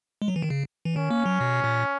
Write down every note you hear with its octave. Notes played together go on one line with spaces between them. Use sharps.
G#3
F#3
E3
D#3
C#3
E3
D#3 C#4
A#3
F#3
B2
A#2